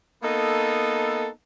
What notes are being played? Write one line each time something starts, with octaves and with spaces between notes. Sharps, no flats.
A#3 B3 D#4 A4